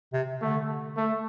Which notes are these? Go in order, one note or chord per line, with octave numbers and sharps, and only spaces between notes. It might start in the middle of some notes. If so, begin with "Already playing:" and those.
C3
D3 A3
A3